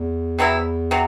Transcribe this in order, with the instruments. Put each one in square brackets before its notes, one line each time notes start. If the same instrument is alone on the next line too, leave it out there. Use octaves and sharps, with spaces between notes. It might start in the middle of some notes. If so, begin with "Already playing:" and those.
Already playing: [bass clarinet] E2
[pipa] C3 F#3 B3 E4
C3 F#3